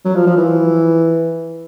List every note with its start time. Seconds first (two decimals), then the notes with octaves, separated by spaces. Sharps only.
0.05 F#3
0.15 F3
0.27 F3
0.37 E3